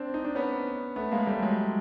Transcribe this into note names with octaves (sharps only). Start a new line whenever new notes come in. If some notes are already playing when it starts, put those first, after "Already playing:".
Already playing: C4 D4
D#4
D4
B3 C#4
A3 B3
G#3 A#3
G3 A3
F#3 G#3